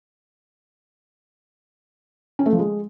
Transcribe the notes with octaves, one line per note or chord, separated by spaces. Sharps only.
C#4
A3
F3
G#3